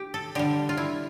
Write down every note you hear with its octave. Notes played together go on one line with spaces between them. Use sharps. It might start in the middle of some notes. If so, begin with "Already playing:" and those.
Already playing: G4
A4
D3 G3 G4
F4
E4